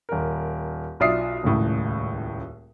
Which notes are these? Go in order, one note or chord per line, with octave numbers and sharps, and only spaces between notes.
D#1 A#4
B1 F4 D5 E5 D#6 C7
D#1 C#2 A2